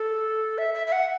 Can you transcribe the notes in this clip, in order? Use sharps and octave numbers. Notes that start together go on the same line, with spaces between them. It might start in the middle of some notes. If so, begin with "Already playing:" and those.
Already playing: A4
E5
E5
E5
F#5